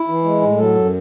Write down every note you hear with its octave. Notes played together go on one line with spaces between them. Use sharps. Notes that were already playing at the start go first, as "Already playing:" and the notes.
Already playing: E4
E3
G#3
A2
F#3 A4
F#2